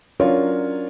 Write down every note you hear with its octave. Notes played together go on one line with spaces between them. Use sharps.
F#3 C#4 D4 F4 A#4 C#5